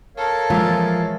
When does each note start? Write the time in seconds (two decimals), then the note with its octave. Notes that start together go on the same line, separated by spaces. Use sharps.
0.17 A4 A#4 C#5 F5
0.50 A#2 E3 F3 G#3 F4